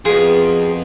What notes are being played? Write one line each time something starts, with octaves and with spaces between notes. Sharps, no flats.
F2 B2 F4 G#4